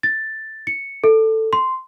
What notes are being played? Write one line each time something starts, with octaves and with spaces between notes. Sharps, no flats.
A6
C#7
A4
C6